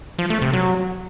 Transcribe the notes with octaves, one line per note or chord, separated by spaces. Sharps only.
F3
A3
C3
F#3